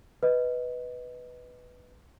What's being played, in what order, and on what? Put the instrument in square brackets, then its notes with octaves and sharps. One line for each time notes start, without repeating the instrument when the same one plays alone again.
[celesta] B4 D#5